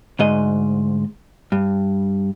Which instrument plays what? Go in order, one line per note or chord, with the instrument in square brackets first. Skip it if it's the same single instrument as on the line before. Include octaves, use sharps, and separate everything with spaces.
[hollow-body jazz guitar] D2 G#2 D#5
G2